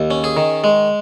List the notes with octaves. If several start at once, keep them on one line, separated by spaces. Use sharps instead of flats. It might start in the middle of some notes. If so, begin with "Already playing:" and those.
Already playing: D#2
C#4
G#4
D#3
G#3